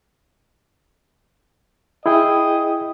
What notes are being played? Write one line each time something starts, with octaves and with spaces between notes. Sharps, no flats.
E4 G#4 D#5 G5